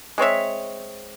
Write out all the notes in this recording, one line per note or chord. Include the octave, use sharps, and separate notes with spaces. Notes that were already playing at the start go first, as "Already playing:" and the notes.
G#3 C4 C#5 E5